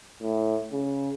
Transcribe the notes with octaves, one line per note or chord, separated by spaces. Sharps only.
A2
C#3